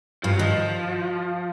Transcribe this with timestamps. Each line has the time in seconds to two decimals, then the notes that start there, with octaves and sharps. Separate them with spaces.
0.23 G2 F3
0.32 F#3
0.39 D#3 F3